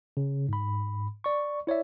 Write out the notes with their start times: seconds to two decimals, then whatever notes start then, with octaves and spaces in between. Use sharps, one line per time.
0.17 C#3
0.49 G#2 B5
1.24 D5 C#6
1.67 E4 C#5 D5 E5